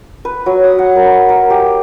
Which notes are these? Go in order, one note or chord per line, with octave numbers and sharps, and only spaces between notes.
B4
F#3
D#6
F#5
A#4
A#4
G4